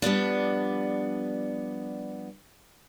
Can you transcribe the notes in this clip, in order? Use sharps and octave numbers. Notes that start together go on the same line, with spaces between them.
F3 G3 B3 D4